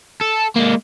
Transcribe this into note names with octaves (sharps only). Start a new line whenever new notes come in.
A4
G#3 A#3